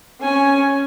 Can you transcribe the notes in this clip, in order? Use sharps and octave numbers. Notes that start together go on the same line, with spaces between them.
C#4 G#5